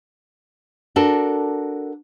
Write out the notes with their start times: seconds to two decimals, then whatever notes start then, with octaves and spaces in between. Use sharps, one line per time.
0.96 D4 F#4 A4 A#4